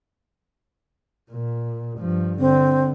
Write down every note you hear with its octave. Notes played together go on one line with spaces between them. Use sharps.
A#2
G2 F3
D3 C4